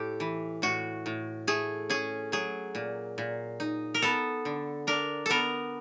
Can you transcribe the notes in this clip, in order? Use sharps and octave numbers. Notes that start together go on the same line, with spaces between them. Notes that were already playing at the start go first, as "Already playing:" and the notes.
Already playing: A2 G4 A4
E3
A2 F#4
A2
A3 G#4
C#4 G#4
F#3 G#4
A#2
A#2
D#4
A#4
B3 A4
D3
D4 A#4
B3 A4 A#4